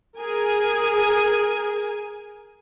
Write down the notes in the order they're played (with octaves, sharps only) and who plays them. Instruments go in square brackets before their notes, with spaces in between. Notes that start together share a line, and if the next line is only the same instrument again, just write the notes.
[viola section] G#4 A#4 G#5